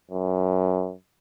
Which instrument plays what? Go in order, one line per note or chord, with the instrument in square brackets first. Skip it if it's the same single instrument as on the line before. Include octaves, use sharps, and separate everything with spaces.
[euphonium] F#2